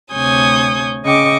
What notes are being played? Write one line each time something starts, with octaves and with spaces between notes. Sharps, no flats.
D2 C3 C#5 G#5 D#6 G6
C#3 D#5 G5 C#6 D6